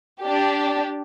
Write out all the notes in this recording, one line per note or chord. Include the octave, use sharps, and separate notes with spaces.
D4 G4